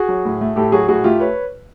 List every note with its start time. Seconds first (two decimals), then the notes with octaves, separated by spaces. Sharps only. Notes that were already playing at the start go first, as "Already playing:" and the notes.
Already playing: F#4 G#4
0.09 F#3
0.25 A2
0.41 A3
0.56 A2 G4 A4
0.72 F#3 F#4 G#4
0.88 A2 F#4 G#4
1.04 A3 F4 G4
1.20 B4 C#5